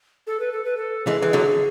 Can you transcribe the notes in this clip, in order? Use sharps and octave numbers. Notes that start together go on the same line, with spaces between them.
A4
B4
A4
B4
A4
E3 G#3 G#4
E3
D3 F#3